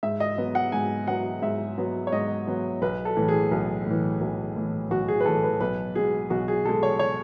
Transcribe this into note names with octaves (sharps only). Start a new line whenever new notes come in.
G#2 E5
D#5
F#3 B3
F#5
G#2 G#5
F#3 B3 F#5
G#2 E5
F#3 B3
C#5
G#2 D#5
F#3 B3
B1 B4
A4
A2 E3
G#4
B1
A2 E3
B1
A2 E3
B1 F#4
G#4
B4
A2 E3 A4
B4
B1 B4
B2 G#3 G#4
B1 F#4
G#4
B2 G#3 A4
C#5
C#5